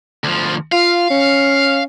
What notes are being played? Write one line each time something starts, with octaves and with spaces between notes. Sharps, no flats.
D2 F3
F4 F5
C#4